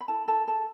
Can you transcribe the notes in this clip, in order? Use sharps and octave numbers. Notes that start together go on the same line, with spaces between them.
B5
E4 A4 A5
E4 A4 A5
G#4 A4 A5